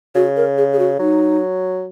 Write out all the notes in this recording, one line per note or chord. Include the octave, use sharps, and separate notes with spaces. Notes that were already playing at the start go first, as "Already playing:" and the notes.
C#3 F#4
A#4
G#4
G#4
F#4
F#3 D#4